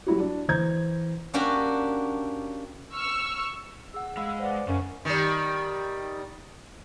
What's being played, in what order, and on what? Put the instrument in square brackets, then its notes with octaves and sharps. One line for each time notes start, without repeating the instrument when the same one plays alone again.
[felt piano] F#3 G3 E4 F#4
D4
E3 C5 A#5 G6 G#6
[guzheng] A#3 C#4 D4 F#4 G4
[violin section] C#6 E6 F6
[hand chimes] G#4 F#5 [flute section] E6
[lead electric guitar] G#3 [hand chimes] F5 B5
[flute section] B4 D5 F#5 [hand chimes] C5
[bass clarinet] F#2 [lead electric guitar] C#3 [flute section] G#5 [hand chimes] C#6
[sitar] D#3 G3